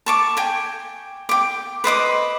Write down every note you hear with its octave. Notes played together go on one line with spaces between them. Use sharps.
A5 C#6 D6
G5 G#5
G5 D6
B4 C5 D#5 D6